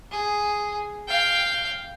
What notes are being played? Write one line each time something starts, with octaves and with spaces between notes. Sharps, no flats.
G#4
F5 G5